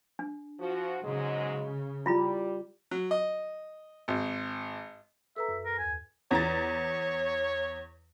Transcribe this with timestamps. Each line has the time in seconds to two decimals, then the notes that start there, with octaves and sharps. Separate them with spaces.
0.19 D4
0.60 F3 F#4
1.03 G#2 C#3 F#3 G#3
2.06 G3 E4 F4 B5
2.91 F#3
3.11 D#5
4.08 G#1
5.36 A4 B4 E5 A#5
5.48 F#2
5.65 A#4
5.79 D#2 G#5
6.31 E2 C#5 A#5 A6